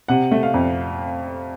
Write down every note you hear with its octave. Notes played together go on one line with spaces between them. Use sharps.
C3 F#5
A3
F5
F2